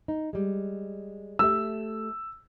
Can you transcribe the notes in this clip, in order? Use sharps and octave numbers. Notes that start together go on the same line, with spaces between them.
D#4
G3 G#3
A3 G4 E5 E6